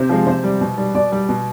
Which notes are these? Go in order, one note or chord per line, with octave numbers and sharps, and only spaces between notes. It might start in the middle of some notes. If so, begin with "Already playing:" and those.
Already playing: C3 C5
F3 G#3
C3 C5
G3
B2
G3
B2 D5
G3
B2